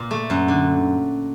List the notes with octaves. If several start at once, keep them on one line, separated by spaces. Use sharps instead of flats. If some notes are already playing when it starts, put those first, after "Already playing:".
Already playing: A#2
A3
F#2
D3